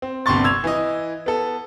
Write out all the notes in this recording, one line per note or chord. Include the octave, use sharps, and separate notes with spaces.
C4
G1 G2 C3 C6 C#6 A6
E6 G#6 F7
E3 D#5
B3 A4